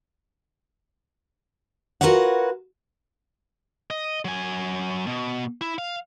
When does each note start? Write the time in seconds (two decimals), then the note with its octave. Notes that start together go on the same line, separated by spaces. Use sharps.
2.01 F4 F#4 A#4 B4 C#5 F#5
3.91 D#5
4.25 F#3 G#5
5.07 B2
5.61 E4
5.78 F5